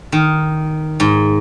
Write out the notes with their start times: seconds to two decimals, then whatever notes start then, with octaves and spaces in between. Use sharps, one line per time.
0.12 D#3
1.00 G#2